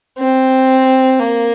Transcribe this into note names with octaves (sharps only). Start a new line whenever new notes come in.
C4
A#3